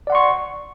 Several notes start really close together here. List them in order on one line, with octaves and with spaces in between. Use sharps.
D5 F#5 C6 C#6